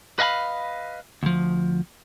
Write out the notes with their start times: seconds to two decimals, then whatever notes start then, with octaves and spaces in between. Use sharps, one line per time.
0.19 B4 D#5 F5 G#5 B5
1.23 D2 F3